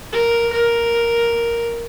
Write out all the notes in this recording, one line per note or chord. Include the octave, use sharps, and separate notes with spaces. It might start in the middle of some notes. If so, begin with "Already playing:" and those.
A#4
A#4